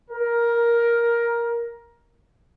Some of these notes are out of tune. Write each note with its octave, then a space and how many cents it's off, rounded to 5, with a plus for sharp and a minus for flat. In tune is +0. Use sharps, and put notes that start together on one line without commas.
A#4 +10